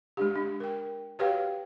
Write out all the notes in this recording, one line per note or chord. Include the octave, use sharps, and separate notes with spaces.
G#3 D4 G4
D4
A#4 G5
F#4 G4 B4 C#5 F5 G5